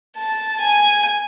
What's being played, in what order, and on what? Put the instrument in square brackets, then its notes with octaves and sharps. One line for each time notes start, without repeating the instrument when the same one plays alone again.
[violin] A5
G#5